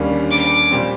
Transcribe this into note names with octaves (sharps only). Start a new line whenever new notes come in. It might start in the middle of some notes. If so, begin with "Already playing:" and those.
Already playing: D#2 D3 G3 A#3 C#4
D6
A#2 G3 C4